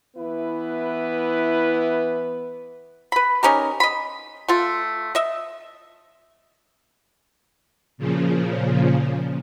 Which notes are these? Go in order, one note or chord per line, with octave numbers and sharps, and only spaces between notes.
E3 B3 E4 B4
B4 B5
C#4 D#4 G4 A#4
D#5 B5
A3 F4
D#5 E5
A#2 C#3 F3